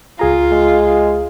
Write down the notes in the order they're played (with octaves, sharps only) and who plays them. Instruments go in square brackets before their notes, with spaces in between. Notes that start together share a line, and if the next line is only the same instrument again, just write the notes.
[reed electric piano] C#2 G#4 A#5 [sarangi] F4
[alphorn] G#3